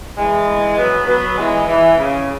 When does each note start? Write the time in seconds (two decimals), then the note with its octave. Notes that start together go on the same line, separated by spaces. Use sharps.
0.17 E3 G#3
0.77 F#3 B3
1.08 F#3 B3
1.37 E3 G#3
1.67 E3
1.97 C#3